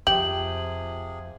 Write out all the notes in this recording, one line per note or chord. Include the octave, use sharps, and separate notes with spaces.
F2 C3 F3 G4 G#4 F#7